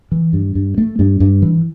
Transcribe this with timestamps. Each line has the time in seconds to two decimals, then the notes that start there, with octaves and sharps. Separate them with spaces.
0.12 E3
0.33 G2
0.55 G2
0.78 A3
0.99 G2
1.20 G2
1.42 E3